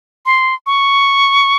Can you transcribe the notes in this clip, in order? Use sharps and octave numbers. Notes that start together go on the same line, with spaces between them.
C6
C#6